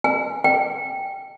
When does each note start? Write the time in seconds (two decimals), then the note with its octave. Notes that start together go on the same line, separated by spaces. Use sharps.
0.04 G#5
0.44 G5